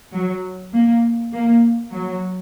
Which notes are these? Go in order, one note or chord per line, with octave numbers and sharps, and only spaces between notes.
F#3
A#3
A#3
F#3